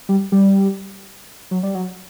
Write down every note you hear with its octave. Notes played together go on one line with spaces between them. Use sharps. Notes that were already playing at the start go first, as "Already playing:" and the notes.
G3
G3
F#3
G3
F#3